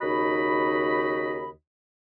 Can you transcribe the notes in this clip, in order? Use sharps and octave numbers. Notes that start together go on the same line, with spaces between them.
D#2 C#3 D#4 F#4 D#5 B5